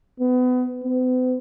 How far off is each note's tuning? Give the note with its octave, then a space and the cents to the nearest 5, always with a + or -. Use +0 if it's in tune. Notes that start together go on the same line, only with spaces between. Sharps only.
B3 +30
B3 +45